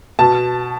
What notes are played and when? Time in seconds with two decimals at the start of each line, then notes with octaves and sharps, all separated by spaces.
0.19 B2 A5